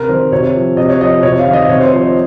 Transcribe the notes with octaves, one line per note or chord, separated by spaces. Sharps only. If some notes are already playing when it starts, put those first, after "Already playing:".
Already playing: C3 A#4
D#3 C5
C3 C#5
F3
C3 D#5
C#5
F3 D#5
C3 C#5
F5
D#3
D#5
C3 C#5
C5
F3 C5
D#5